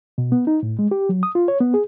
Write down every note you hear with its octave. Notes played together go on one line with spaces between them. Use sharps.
B2
B3
D#4
A2
G#3
G4
F#3
D#6
F4
C#5
B3
G#4